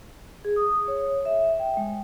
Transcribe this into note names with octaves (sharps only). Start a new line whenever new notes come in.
G#4
D#6
C#5
E5
G5
G#3